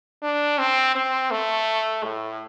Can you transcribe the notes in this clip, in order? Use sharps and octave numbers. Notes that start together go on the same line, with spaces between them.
D4
C4
C4
A3
A2